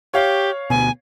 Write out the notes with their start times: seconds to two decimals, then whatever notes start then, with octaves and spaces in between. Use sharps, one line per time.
0.14 G4 C#5 F5 C#6
0.70 D2 B2 G#5